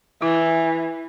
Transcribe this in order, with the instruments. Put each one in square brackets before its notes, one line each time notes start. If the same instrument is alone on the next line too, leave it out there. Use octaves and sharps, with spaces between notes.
[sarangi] E3 [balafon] E4